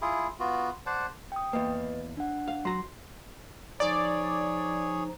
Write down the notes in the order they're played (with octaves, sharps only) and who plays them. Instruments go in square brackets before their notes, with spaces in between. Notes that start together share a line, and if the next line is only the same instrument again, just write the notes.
[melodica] E4 F4 G#4
B3 F4 F#4
C5 D5 F#5 A5
[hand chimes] G5 D#6
[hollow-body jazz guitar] E2 A#3 [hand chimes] B4 D#5
[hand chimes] D4 F#5
[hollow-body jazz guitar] F5
[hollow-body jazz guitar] F#3 A#5 [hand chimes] C6 C7
[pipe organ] F3 D#4 [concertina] G#4 C#5 [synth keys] D5